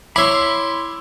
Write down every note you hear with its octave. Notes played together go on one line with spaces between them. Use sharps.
E4 C#5 B5 C6 D6 E6